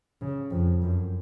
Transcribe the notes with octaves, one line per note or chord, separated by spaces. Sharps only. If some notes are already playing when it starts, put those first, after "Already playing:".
C#3
F2
F#2